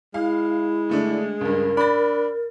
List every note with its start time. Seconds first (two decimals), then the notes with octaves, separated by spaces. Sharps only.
0.14 G#3 E4 F5
0.89 D3 A3 D4
1.41 C#2 G2 A#4
1.77 D4 B5 A6